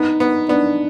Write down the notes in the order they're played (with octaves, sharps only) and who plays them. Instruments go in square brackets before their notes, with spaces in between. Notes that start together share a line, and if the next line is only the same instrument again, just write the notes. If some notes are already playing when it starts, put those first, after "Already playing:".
Already playing: [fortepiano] B3 [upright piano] D#4
[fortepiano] B3
[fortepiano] B3 [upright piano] D4